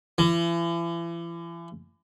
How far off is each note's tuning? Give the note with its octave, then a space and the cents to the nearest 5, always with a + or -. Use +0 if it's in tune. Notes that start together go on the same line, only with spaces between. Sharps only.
E3 +40